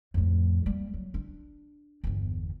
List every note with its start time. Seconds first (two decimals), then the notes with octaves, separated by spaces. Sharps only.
0.14 F2 A2
0.66 G3 A#3
0.94 F#3
1.14 D4
2.04 G1 E2